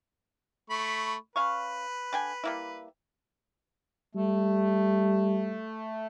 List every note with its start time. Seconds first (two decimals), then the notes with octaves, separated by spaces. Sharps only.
0.70 A3 B5 C#6
1.36 C#4 B4 F5 C#6
2.13 D3 G5 G#5
2.44 G3 A#3 E4
4.15 G3 A3